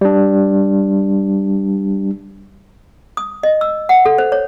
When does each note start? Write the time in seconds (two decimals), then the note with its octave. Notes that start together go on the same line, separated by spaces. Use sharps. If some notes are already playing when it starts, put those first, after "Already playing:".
0.01 G3 D4
3.17 D#6
3.43 D#5
3.61 E6
3.89 F#5
4.05 A4
4.18 C5
4.32 C#5